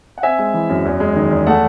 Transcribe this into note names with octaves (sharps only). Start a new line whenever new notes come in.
F#5
C4 E5 G#5
G#3
E3
F#2
E2
G#3
D#3
E2
A3 F#5 A5